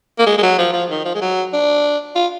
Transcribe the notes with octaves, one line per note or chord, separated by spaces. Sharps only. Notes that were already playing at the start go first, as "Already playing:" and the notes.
A#3
G#3
G#3
F#3
F3
F3
D#3
F3
G#3
F#3
D4
F4